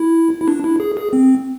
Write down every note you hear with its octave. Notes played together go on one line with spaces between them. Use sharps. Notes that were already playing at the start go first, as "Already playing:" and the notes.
Already playing: E4
E4
D4
E4
G#4
G#4
C4